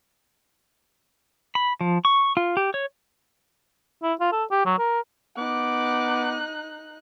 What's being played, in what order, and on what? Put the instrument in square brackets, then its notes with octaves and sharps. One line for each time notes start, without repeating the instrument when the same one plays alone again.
[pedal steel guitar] B5
F3
C#6
F4
G4
C#5
[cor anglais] E4
F4
A4
G4
F#3
A#4
[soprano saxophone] B3 [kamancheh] D#4 F#6 [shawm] D6